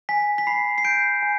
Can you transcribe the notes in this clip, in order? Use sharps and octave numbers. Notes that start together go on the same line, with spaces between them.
G#5 B6
B6
B5 C7
C7
G6 D7
G#5